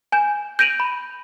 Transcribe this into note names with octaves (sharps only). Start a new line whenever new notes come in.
G#5 G6 E7
G6 A#6 D7 D#7 F7 F#7
B5